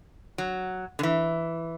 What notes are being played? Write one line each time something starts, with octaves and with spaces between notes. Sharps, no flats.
F#3
D3
E3